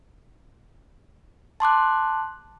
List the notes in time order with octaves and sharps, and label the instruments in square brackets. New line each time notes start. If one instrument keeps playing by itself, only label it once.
[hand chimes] A5 C6 D6 F#6